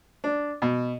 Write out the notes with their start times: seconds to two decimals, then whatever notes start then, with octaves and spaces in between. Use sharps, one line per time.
0.24 D4
0.62 B2